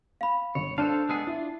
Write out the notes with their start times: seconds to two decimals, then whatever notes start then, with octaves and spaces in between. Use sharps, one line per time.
0.21 F5 B5
0.55 G1 C#5
0.78 D4 A4 C5 F5 A5
1.09 G#3 B3 G#4
1.27 D4 E4 F4